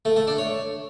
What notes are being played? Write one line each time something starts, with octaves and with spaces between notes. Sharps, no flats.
A3
A3
D4
C#5